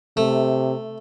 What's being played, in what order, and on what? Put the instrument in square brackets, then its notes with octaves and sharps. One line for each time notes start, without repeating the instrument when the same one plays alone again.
[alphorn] C3 [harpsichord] A3